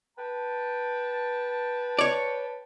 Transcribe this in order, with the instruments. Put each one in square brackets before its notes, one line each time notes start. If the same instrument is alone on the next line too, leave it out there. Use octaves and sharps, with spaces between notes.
[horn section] B4 G5 A5
[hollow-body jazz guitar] C#5 D5